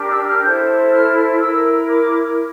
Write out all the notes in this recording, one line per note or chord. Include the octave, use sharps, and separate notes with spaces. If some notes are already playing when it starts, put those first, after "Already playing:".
Already playing: D4 G4 A#4
E6
F6
E4 A4 C5 G6
F6
E4 A#4 E6
D6